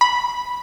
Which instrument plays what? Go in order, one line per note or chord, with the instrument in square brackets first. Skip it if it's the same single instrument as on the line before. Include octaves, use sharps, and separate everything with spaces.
[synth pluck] B5